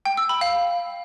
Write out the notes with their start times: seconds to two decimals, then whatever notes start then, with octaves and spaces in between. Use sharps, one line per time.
0.06 G5
0.17 E6
0.29 B5
0.41 F5